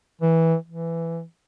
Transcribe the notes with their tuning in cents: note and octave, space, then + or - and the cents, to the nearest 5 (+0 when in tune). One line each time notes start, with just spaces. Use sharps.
E3 -10
E3 +10